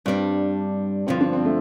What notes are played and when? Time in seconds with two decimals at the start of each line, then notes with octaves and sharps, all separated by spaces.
0.05 G2 G3 C4 D4
1.07 G2 D3 F3 C4
1.21 D4
1.33 C4
1.45 A3